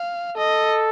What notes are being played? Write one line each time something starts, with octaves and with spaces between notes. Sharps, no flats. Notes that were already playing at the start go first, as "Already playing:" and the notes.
Already playing: F5
A4 D#5